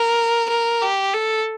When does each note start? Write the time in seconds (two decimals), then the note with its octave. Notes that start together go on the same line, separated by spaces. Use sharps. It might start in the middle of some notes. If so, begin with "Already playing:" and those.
Already playing: A#4
0.49 A#4
0.82 G4
1.14 A4